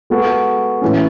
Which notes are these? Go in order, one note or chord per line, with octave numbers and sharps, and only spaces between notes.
G#3 B3 F#4 A4
A2 E3 G#3 C#4